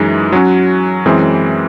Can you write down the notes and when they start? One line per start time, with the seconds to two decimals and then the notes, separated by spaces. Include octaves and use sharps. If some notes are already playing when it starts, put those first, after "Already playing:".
Already playing: F#2 E3 G#3 D#4
0.32 F#3 C#4 F#4
1.05 F#2 E3 G#3 C4